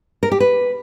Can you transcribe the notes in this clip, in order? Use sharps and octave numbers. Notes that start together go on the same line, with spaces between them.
A#4
G4
B4